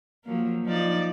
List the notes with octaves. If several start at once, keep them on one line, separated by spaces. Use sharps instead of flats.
F3 F#3 A#3
F3 D#4 D5